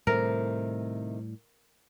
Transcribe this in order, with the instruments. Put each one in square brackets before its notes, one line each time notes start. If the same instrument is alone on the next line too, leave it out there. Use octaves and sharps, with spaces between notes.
[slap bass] A2 G3 [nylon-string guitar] C3 D#3 A3 [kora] A#4